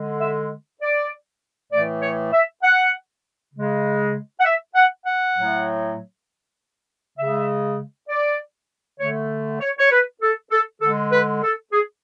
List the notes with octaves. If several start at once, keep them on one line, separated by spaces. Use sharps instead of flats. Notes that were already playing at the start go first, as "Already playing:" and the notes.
Already playing: D3 G#3
E5
D5
A2 E3 A3 D5
C#5
E5
F#5
C#3 G#3
F#5
E5
F#5
F#5
A2 F#3 A3
C#3 G#3 E5
D5
D3 A3 C#5
C#5
C#5
B4
A4
A4
D3 G#3 A4
B4
A4
G#4